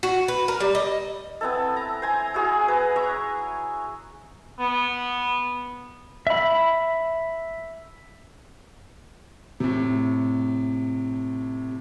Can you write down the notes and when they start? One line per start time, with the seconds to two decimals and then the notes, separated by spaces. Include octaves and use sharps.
0.03 F#4
0.28 B4
0.48 A#4
0.60 G3
0.75 D#5
1.41 B3 C4 E4 A4
1.76 A#5
2.02 C5 G#5 A#5
2.34 E4 F#4 G#4
2.68 B4 A#5
2.96 C#5 E5 A#5 C#6
4.59 B3
6.27 E5 B5
9.60 A2 C3